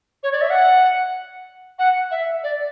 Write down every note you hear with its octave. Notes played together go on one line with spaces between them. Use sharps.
C#5
D5
E5
F#5
F#5
E5
D5